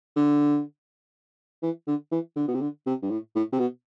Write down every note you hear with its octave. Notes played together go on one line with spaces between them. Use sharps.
D3
E3
D3
E3
D3
B2
C3
D3
C3
G2
A2
A2
C3
B2